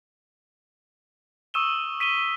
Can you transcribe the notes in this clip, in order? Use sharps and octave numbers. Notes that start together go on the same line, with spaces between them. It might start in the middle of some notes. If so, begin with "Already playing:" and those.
C#6 D#6 E6 D#7 E7 G7
B6 D#7 E7 G7